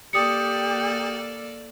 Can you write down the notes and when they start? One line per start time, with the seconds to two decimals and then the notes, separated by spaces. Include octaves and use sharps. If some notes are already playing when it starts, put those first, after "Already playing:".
0.13 A#3 G4 A4 D5 D#6 C#7